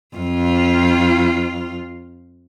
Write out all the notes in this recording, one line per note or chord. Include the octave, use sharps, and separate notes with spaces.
F2 F4